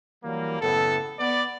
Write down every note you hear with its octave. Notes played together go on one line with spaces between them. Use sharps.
E3 F#3 G3 A#3
F#1 A2 B3 A4
B3 D5